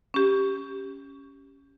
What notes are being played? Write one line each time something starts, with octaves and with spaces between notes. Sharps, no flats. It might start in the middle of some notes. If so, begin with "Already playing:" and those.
C#4 G4